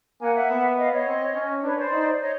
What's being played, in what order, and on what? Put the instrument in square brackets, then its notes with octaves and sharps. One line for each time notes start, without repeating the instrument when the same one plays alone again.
[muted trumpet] A#3 [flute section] F#5 G#5
[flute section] E5 F#5
[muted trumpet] B3
[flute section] D#5 F5
C#5 D#5
[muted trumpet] C4
C#4
[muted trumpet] D4 [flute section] B4 C#5
[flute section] C5 D5
[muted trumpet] D#4
[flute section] C#5 D#5